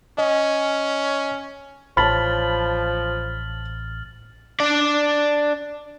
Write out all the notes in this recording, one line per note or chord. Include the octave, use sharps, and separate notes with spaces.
C#4 D#5
A1 F3 C#5 A5 B5 F6 A6 F#7
D4 D5